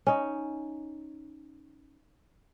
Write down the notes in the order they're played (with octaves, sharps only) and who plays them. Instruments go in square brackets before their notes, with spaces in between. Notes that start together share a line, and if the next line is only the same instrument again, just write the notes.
[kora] C#4 D#4